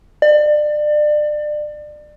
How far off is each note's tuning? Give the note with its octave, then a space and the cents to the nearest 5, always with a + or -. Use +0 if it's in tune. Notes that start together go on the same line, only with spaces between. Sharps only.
D5 +30